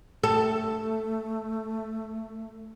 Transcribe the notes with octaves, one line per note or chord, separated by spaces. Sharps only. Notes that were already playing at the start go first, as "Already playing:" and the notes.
A3 A4